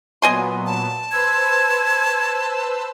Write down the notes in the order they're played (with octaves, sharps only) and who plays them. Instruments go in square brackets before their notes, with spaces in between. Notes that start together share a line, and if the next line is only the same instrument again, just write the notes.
[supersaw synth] A#2 F#3 B3 [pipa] D#5 G#5 C6
[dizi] A5
[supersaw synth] B4 C5 E6 [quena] G#6